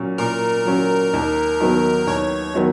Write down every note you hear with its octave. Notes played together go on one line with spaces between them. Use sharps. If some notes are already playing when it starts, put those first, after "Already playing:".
Already playing: A#2 F#3 C#4
A#2 A#4
F#3 C#4
D#2
D#3 F#3 B3
D#2 C#5
D#3 F#3 B3